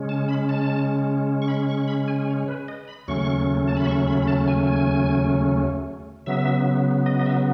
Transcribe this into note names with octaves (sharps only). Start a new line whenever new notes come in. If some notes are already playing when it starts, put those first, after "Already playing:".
Already playing: C#3 G#3 C#4
A5
B5
A5
C#6
B5
C#6
B5
G#5
C#5
B4
D#5
B5
D#2 C#3 F#3 A3 C#4 C#6
A5
B5
C#6
B5
B5
A5
G#5
G#5
C#3 F#3 B3 E5
D#5
D#5
E5